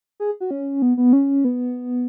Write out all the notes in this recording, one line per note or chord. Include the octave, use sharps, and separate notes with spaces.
G#4
F#4
C#4
B3
B3
C#4
B3